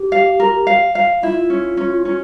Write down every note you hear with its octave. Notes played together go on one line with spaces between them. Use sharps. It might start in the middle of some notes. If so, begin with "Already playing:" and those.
Already playing: G4
F5
A#4
F5
F5
E4 F4
C#4
C#4
C#4